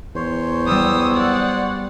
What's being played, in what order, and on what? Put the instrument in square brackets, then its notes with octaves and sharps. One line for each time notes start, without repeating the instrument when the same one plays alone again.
[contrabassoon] E2 [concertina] C5 C#5
[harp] G3 B3 [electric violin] D#6 E6
[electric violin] D5 F#5